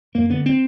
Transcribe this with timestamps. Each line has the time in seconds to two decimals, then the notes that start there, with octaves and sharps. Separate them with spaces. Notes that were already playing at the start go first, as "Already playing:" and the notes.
0.15 F#2 A#3
0.30 D3 B3
0.46 C4